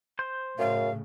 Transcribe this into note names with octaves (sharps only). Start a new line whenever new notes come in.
C5 C6 G6
F#2 A2 C#3 F5